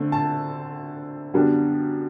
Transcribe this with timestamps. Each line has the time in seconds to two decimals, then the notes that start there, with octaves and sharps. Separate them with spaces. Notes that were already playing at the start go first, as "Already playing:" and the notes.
Already playing: D3 A3 C4
0.12 A5
1.34 F#2 D3 G3 B3 D4